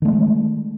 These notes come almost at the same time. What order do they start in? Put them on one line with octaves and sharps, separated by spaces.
D#3 A3 G#3